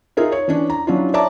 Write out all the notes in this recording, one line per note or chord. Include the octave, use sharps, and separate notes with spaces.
D#4 F4 G#4 A#4 E5
C#5
E3 C#4 D4
A#5
F#3 C#4 D4 E4 F4
C#5 D5 E5 A5 A#5 D6